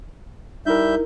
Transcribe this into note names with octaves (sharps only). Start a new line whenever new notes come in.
G3 D#4 E4 A#4 E5 G6